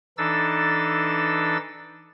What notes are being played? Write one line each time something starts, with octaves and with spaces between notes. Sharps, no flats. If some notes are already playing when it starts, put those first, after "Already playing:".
E3 D4 D#4 A4 E6 A6